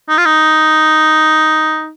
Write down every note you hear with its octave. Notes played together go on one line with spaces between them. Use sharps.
D#4
F4
D#4